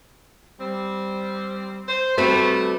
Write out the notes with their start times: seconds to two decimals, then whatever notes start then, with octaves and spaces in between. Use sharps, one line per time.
0.60 G3 C4
1.88 C5
2.18 C3 G3 A3 C4 F#4 B4